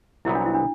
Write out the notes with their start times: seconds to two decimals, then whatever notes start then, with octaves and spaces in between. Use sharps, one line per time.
0.25 C2 C3 F#3 B3 E4
0.35 D4
0.46 E4
0.54 D4